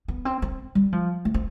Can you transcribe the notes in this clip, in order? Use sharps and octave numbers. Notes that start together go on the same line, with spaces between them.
B3
C4
C4
G3
F3
A3
C4